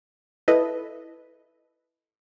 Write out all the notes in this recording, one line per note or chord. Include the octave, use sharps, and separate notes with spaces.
E4 A4 B4 D#5